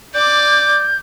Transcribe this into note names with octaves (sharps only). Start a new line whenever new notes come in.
D5 D6 G6